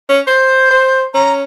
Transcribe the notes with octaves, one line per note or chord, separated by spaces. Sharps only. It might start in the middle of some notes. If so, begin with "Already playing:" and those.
C#4
C5 G6
C5
C#4 A#5